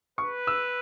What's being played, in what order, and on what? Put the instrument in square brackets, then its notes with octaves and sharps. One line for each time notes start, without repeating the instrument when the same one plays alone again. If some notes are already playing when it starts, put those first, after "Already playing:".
[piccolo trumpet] B4 [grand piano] C#6
[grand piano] E6